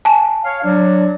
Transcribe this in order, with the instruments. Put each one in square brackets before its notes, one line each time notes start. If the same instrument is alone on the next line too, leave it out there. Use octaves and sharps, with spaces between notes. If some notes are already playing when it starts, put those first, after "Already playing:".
[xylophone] G#5 A5
[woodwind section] C#5 F5
F#3 D4